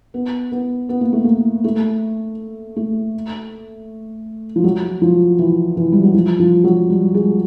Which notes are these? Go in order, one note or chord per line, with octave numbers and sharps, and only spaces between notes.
B3
B3
B3
A#3
A3
A#3
A3
A3
F3
F#3
F3
E3
E3
G3
F#3
F3
F3
F#3
G3
G#3